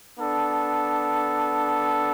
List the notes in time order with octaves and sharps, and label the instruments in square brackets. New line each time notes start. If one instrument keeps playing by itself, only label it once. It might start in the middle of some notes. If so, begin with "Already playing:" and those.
[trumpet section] B3 D4 A4